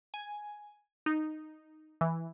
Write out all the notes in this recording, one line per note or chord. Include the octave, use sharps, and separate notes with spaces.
G#5
D#4
E3